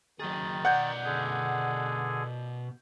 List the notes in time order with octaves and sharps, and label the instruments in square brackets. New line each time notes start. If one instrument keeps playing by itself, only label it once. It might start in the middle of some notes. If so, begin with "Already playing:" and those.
[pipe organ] D#3 A6 [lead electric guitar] F#3 G#4
[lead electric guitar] B2 D5 [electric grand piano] F#5 G6
[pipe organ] D3 G#4